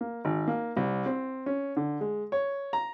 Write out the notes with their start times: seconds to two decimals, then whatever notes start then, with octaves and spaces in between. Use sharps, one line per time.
0.01 A#3
0.25 G#1
0.47 A#3
0.77 C2
1.06 C4
1.46 C#4
1.76 D3
2.01 G#3
2.32 C#5
2.73 A#5